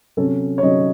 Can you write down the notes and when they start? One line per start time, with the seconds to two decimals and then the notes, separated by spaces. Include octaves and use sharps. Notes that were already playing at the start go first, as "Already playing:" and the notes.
0.17 C3 F#3 C#4 A4
0.58 C#5
0.62 C3 F#3 C#4 D#5